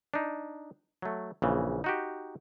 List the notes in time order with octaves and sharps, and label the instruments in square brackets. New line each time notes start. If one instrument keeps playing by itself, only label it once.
[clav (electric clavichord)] D4 D#4
F#3 A3
A#1 C#3 E3
D#4 F#4 G4